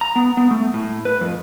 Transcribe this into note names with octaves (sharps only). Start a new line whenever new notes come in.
A#5
B3
B3
A3
A2
B4
F2